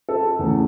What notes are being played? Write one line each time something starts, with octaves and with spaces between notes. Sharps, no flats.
A4
E2 C#3 A3